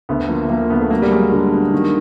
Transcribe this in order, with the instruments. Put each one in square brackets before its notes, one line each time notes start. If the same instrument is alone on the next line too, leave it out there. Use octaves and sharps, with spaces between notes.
[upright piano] D2 [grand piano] B3
[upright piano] F3 [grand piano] A#3
[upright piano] F3 [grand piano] A#3
[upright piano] D2 [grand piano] B3
[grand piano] A3
[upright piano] F#3 [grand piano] A#3
[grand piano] G3
[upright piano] F#3 [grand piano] G#3
[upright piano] D3
B3
D#3